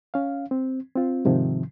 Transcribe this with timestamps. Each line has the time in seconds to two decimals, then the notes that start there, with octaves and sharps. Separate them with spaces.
0.14 C#4 F5
0.51 C4
0.96 C4 F4
1.25 G#2 C3 D#3 F3